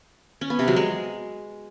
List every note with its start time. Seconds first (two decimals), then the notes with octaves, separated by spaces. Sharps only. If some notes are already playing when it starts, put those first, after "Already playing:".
0.41 C#4
0.50 B3
0.59 C3
0.68 F#3
0.76 G#3